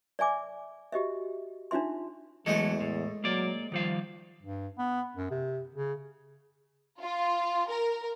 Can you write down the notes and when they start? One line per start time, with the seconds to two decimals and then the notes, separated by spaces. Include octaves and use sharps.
0.19 D5 E5 G#5 D6
0.92 F#4 G4 D#5 E5
1.71 D4 D#4 F4 E5 C6
2.46 E2 E3 F#3 G#3 A3 A4 C5
2.80 A2
3.24 F#3 A#3 D5
3.72 D#3 F3 G3 F5
4.42 G2
4.78 B3
5.16 F#2
5.31 C3
5.75 C#3
7.01 F4
7.69 A#4